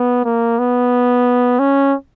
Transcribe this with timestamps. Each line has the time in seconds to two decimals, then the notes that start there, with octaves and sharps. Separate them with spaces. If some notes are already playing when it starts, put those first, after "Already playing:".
Already playing: B3
0.25 A#3
0.59 B3
1.59 C#4